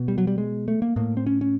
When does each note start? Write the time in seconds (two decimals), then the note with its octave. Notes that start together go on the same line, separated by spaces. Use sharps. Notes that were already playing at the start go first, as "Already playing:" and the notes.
Already playing: B2
0.08 G3
0.18 F#3
0.27 G3
0.38 G#3
0.68 A3
0.82 A#3
0.96 A2 A#3
1.17 C4
1.26 C#4
1.41 C#4